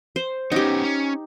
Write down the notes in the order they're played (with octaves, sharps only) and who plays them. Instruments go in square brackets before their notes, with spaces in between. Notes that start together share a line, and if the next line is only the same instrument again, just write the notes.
[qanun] C5
[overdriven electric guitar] B3 C#4 [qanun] D#4 G4
[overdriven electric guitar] C#4